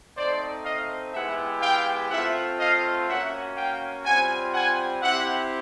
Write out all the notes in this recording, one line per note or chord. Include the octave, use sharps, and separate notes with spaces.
A3 C4 D#4 C5 D5
D#5 F5
G#3 B3 E4 G4 E5 F#5
F5 G5
A3 C4 F4 E5 F#5
D#5 F5
A#3 C#4 F#4 E5 F#5
F5 G5
G3 C4 F4 F#5 G#5
F#5 G#5
C4 E4 G4 E5 F#5